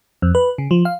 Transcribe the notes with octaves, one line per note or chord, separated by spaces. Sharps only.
F2
B4
C#3
F3
F5